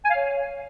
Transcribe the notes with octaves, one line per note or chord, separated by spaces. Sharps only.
G#5
F5
C#5